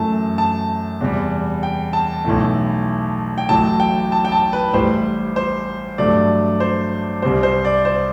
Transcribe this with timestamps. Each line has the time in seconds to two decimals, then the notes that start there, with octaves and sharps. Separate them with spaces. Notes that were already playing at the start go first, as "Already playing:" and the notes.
Already playing: F#2 E3 A3 A5
0.38 A5
1.01 E2 C3 G3
1.63 G5
1.93 A5
2.25 B1 A2 E3 A3
3.38 G5
3.49 A1 A2 F#3 A5
3.80 G5
4.12 A5
4.25 G5
4.32 A5
4.53 B4
4.73 A1 A2 G3 C5
5.36 C5
5.98 A1 G2 F#3 A3 D5
6.60 C5
7.22 C2 C3 G3 C5
7.43 C5
7.65 D5
7.85 C5